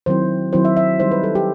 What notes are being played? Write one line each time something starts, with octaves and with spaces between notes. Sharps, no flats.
D#3 F#3 C4 E4 C5
D#3 F#3 C4 E4 C5
E5
E5
D#3 G3 D#4 C5
B4
A4
G4